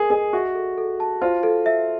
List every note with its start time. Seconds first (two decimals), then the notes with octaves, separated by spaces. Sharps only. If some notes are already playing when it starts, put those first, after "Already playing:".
Already playing: G#4 A#4 D#5
0.10 G#4 D#5
0.33 F#4 E5
0.55 A4
0.78 A4
1.00 A5
1.22 F4 C5
1.43 A4
1.66 E5